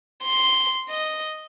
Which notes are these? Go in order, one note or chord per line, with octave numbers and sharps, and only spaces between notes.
C6
D#5